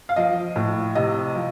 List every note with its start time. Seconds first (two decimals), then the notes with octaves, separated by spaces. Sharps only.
0.09 F5
0.16 F3 D#5
0.56 A2
0.95 C3 D#5
1.35 F3